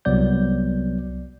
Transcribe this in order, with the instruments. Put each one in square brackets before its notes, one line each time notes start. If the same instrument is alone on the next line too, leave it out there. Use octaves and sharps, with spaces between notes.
[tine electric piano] C2 F#3 B3 D5 G6